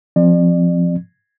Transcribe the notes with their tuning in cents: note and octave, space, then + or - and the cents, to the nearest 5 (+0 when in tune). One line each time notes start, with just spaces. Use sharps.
F3 +0 C4 +0 D5 +35